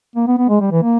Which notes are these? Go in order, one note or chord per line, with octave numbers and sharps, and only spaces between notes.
A#3
B3
B3
G#3
G3
E3
A#3